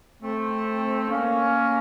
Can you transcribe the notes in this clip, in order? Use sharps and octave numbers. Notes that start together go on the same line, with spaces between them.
A3 C4
A#3 C#4